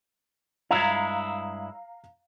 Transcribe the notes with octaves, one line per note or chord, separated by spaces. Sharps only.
G2 G#3 E4 F5 A#5 F7